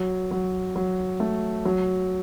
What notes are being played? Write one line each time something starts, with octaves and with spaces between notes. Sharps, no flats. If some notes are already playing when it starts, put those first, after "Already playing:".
Already playing: F#3
F#3
F#3
A3
F#3